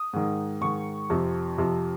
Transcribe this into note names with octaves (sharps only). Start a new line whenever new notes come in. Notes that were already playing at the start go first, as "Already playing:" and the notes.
Already playing: D#6
G#2 D#3
G#2 D#3 C#6
F2 C3 F3
F2 C3 F3